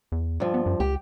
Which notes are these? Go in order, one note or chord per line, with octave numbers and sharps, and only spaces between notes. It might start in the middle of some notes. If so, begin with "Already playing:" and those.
E2
G2 F3
B3
F#2
C#2 G4